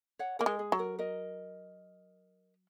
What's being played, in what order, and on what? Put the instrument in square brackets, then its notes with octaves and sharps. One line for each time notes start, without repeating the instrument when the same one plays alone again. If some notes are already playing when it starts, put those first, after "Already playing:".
[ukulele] C#5 F#5
[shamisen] A#3 [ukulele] A#4 D#5
[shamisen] G#3
[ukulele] G#4
[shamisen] F#3
[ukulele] A#4
A#4 D#5